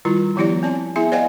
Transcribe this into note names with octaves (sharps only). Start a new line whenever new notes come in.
D#3 G3 E4 F4
D#3 F3 B3 E4 G4 D5
C4 D5 A5
B3 E4 G#4 E5 G#5
C5 D5 D#5 F5 G5 G#5